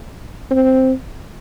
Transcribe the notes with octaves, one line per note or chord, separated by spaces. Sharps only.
C4